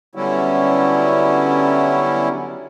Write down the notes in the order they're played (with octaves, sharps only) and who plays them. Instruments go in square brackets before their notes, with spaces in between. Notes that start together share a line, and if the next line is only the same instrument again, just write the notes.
[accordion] D3 F#3 G3 B3 C#4 E4